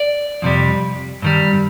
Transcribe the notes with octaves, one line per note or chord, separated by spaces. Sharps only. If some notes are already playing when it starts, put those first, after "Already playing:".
Already playing: D5
F2 C3 G3
G2 D#3 G3